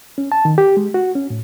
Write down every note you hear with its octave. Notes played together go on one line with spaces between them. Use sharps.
C#4
A5
D#3
G4
G#3
F#4
C#4
A2